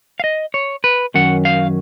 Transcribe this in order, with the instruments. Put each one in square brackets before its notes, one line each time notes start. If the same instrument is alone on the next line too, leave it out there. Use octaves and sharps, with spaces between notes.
[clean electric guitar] F5
D#5
C#5
B4
F#2 D#3 F#3 C#4 F#5
F5